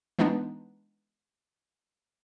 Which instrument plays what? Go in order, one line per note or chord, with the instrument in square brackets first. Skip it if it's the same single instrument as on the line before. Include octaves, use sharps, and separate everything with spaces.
[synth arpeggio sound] E3 G#3 B3 D4 D#4